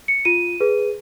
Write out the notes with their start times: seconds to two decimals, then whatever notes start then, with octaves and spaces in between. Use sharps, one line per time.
0.08 C#7
0.25 F4 D#7
0.60 G#4 B4